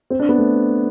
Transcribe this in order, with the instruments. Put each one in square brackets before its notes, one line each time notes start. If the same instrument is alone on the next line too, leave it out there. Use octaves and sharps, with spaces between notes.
[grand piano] C4
D4
B3
A3